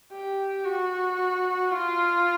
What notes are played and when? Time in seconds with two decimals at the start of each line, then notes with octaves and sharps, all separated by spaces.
0.12 G4
0.65 F#4
1.71 F4